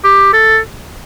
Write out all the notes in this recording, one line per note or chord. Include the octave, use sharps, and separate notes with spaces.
G4
A4